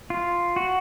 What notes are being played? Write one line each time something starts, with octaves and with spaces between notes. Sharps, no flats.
F4
F#4